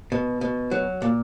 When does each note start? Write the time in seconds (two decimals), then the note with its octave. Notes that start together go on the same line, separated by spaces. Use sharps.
0.12 B2
0.41 B2
0.71 F#3
1.02 A#2